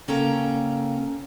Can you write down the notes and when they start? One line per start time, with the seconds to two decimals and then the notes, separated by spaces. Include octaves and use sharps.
0.08 C#3 A#3 C#4 A4 G5 A#5